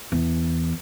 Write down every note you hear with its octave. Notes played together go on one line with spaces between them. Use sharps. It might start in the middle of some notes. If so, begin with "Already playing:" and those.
E2